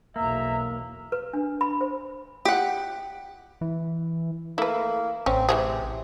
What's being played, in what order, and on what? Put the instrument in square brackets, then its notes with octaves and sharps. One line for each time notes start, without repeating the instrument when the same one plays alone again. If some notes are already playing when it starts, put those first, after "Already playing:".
[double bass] B1 E2 [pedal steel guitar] A#3 [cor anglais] E5 [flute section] A#5
[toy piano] B4
D4
B5
C5
[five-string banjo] G4 F#5
[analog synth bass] E3
[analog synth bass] A3 [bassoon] A#3 [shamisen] E4 B4
[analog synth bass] A1 [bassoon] C4 [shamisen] C#4
[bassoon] C3 [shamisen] E3 F#3 G#4